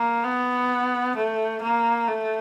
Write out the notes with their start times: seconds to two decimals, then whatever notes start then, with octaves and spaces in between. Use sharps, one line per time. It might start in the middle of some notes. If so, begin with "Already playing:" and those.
Already playing: A#3
0.24 B3
1.16 A3
1.62 A#3
2.08 A3